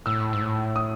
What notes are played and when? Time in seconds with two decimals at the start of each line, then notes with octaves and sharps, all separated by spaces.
0.06 A2 E6
0.33 G#2
0.41 A2
0.76 D#6